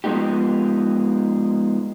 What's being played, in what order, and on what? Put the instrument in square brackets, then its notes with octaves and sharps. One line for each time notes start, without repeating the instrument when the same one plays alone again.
[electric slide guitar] F3 G#3 A#3 B3 D#4 G4